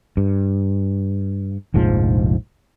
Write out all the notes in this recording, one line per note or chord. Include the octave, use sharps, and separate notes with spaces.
G2
F1 A#1 G#2 F3